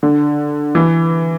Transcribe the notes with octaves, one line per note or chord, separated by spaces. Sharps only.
D3
E3